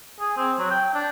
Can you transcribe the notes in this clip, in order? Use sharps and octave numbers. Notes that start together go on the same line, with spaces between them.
G#4
C4
F#3
G5
D4